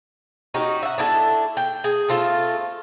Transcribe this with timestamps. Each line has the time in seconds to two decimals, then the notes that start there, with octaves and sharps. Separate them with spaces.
0.54 C#4 D#4 F#4 G4
0.83 E5 F#5
0.98 D4 E4 A4
1.57 G5
1.84 G#4
2.09 A3 C4 F4 A4